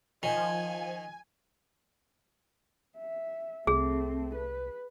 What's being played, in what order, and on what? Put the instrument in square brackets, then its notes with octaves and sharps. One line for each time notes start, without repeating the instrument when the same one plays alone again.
[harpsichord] D#3 [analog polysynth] F3 [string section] G#5
[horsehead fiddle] E5
[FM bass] C2 [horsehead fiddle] A3 C4 [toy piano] G#4
[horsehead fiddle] B4